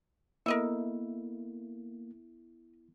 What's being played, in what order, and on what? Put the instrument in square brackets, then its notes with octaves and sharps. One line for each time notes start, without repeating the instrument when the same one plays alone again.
[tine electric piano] A#3 [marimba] B3 A4 [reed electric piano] E4 [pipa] A#4 D#5 E5